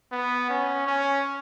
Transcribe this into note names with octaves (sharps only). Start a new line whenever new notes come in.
B3
C#4
C#4